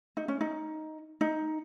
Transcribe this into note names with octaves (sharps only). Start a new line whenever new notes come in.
D#4
C#4
D#4
D#4